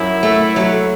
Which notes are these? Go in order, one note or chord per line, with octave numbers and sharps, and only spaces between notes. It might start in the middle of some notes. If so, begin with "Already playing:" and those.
Already playing: F#2 E4
A3
F#3